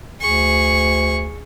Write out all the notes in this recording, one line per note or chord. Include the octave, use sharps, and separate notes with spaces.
D2 G#4 C#6